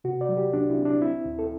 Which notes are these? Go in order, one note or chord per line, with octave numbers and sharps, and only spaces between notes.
C3 F#4
D5
F#3
G4
C2 D4
E4
C4
D4
C4 E4
D2
A4